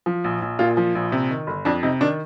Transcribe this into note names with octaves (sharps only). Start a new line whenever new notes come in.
F3
A#1
A#1
A#2 F4
F3
A#1
C3
D#3
G1
F2 D4
C3 D#4
D#3 D4